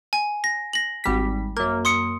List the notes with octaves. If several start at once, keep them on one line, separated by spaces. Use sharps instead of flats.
G#5
A#6
A#6 F#7
G#1 G3 B6
F#2 A#3
C6 D#6 C#7